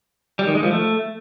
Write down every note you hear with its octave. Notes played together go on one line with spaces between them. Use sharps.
G3
D#3
G#3
F3
A3